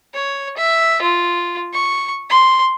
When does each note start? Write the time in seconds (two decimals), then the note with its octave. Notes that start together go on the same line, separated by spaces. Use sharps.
0.14 C#5
0.57 E5
1.02 F4
1.74 C#6
2.30 C6